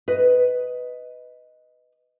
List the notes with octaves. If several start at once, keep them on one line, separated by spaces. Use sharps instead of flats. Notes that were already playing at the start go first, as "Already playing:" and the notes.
B4 D#5